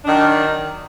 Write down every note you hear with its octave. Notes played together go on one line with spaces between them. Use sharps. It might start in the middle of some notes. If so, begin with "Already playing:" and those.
D#3 F#3 D4